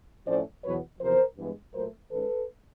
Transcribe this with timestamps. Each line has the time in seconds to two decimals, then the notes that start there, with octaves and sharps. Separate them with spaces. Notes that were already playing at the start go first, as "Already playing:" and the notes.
0.27 A2 F3 A3 C#4 C5 D5
0.64 E2 B2 F#3 B3 B4 C#5
1.01 E2 C3 F3 A#4 C5
1.37 G2 E3 G#3 B3
1.74 A#2 F#3 A3 A#4 C5
2.10 G#2 D#3 G#3 C#4 A4 B4